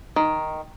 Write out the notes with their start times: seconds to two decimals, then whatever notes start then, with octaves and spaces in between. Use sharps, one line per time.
0.16 D#3